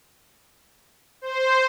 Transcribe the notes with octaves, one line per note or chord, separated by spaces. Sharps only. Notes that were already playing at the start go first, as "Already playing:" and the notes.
C5